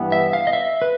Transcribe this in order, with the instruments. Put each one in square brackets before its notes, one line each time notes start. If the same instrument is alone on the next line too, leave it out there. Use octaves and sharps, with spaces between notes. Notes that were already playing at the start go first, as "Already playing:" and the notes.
Already playing: [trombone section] G2 E3 G3 B3
[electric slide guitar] E5
F5
D#5
E5
B4